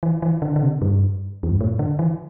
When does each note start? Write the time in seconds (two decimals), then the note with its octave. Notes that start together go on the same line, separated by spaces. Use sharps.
0.03 E3
0.22 E3
0.42 D3
0.56 D3
0.62 C3
0.82 G2
1.43 E2
1.51 G2
1.61 A2
1.79 D3
1.99 E3